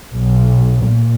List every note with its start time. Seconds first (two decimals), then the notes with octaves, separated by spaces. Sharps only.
0.12 B1
0.83 A#2